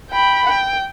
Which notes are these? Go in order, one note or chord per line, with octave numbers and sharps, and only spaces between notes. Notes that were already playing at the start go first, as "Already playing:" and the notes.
G5 B5
G5